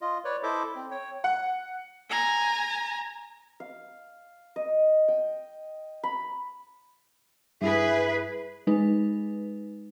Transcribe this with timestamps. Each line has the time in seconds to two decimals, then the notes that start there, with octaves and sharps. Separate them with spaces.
0.01 F4 D#5
0.25 B4 C#5 D5
0.43 E4 A4 C5 D#5 E5 D6
0.75 C4
0.91 C#5 G5
1.24 F#5
2.09 G#5 A#5
3.60 F5
4.56 D#5
5.08 G5
6.03 B5
7.62 G2 E4 G#4 B4 E5
8.67 G#3 D#4 B4